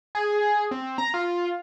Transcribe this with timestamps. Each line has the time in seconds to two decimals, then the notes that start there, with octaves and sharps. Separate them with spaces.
0.15 G#4
0.71 C4
0.98 A#5
1.14 F4